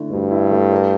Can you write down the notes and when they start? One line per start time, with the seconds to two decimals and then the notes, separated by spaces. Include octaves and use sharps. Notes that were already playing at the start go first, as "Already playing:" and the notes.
Already playing: D3 A3 E4
0.12 D2 G2
0.31 E4
0.51 A3
0.72 A#4